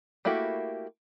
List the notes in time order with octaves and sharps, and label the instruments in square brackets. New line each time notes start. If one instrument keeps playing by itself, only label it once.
[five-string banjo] A3 A#3 E4 F#4 G4